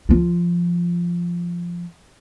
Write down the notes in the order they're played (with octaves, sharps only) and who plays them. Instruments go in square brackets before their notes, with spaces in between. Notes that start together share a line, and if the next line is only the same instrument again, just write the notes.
[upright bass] F3 F4